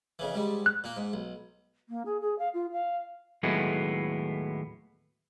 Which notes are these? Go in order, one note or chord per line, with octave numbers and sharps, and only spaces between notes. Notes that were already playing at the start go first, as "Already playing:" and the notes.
F2 C#3 E3
G#2 G3
F#6
A#2 A#3
G#2
B1
A#3
G#4
G#4
F5
F4
F5
D#2 A2 F#3 G#3 A3 B3